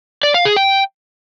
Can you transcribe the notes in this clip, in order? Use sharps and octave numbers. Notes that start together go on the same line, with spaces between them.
D5
F5
G#4
G5